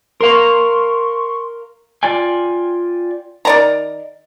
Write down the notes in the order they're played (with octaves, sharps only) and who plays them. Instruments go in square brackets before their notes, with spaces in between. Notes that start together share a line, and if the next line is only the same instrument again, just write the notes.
[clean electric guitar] A#4 F5 [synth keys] C6 C#6
[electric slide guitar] F4 D5 G5 G#5
[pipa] D#3 D5 A#5